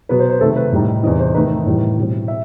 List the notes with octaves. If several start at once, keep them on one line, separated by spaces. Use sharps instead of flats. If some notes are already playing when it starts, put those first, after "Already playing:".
B2 F#3 B3 B4
C5
C5
C3 D#3 A3 A4
B4
A2 G3 D#4
E2 C3 E3 D#5
C5
D#3 A3 D#4 B4
A2 E3 G3
B2 G3 C4
E5